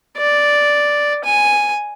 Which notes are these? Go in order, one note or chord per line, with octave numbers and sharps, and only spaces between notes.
D5
G#5